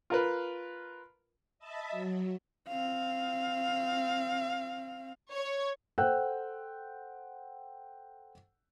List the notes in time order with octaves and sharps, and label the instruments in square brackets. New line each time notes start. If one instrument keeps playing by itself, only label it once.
[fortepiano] F4 A#4 B4
[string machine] D#5 E5 A5 B5
F#3
[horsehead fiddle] C4 F5
[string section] C#5
[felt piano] A4 C5 F#5 G5 E6 F#6